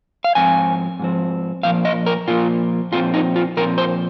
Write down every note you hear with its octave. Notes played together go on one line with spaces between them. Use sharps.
F5
G#2 F3 C4 G#5
G#2 F3 C4
A#2 F3 A#3 F5
D#5
A#4
A#2 F3 A#3 F4
A#2 F3 C4 F4
D#4
F4
A#2 F3 C4 A#4
C5